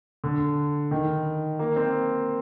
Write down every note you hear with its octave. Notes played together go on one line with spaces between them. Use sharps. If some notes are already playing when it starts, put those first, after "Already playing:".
D3
D#3
A#3
C4